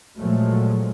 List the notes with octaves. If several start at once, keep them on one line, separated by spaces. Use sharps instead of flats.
A#2 F3 F#3 G#3 A3